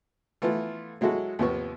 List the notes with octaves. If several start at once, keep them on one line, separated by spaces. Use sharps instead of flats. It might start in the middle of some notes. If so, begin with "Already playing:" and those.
E3 A3 B3 E4 F4
F#3 G#3 E4 F#4 A4
D#2 C3 F3 B3 C#6